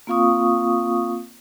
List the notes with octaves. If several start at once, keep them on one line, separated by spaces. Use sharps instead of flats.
A#3 C4 F4 F5 C#6 D#6